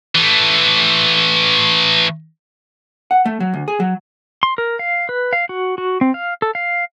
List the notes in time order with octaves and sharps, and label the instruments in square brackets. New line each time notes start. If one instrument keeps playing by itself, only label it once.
[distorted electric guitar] E3 A3
[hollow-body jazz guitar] F#5
A3
F#3
D2
G#4
F#3
[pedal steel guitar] C6
A#4
F5
B4
F5
F#4
F#4
C4
F5
A4
F5